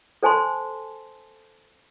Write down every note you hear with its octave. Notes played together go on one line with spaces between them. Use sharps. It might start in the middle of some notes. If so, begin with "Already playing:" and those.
A4 C5 G#5 A5 C6